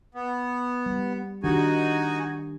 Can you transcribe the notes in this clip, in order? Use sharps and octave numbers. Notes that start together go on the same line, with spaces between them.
B3
G3
D#3 D4 D#4 F#4 G4 G#5